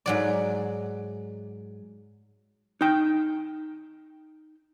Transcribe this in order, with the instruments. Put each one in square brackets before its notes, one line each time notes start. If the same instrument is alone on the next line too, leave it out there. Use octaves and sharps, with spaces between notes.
[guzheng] G#2 F#3 D5
[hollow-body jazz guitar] D#4 G5